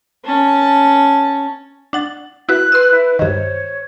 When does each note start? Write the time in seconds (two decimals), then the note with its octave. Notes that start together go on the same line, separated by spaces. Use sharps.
0.25 C#4 A5
1.93 D4 F#5 A6
2.49 E4 F#4 B4 F#6
2.72 B4 C6 E6
2.91 E4
3.19 G2 D#3 C5 C#5